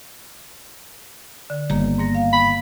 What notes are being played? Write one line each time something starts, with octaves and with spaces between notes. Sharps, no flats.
D3
G1 D#3 A#3
G#2 A#3 A#6
F5
B5